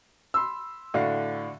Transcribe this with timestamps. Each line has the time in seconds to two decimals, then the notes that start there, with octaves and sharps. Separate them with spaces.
0.34 B5 C6 E6
0.94 A2 D3 D4 F#4 F5